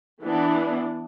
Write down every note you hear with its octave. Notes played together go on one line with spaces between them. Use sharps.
E3 B3 D4